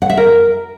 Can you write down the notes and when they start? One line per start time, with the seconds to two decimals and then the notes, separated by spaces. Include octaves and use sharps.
0.02 F#5
0.10 E5
0.17 A#4